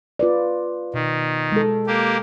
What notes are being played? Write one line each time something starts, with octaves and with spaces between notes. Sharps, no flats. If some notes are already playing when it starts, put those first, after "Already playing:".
F4 B4 D5
B2 D#3
G#3 A4
A#3 G4